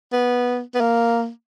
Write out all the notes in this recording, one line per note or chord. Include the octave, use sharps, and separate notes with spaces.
B3
B3
A#3